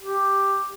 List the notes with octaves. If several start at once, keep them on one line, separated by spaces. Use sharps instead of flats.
G4